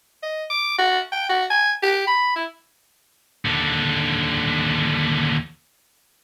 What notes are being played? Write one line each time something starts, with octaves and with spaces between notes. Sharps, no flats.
D#5
D6
F#4
G5
F#4
G#5
G4
B5
E4
D#2 D3